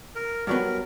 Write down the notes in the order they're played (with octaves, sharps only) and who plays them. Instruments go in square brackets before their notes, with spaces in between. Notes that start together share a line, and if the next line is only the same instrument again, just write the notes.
[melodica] A#4
[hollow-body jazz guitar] G2 F#3 B3 [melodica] A#4